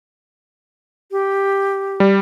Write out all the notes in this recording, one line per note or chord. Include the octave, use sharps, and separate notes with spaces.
G4
G3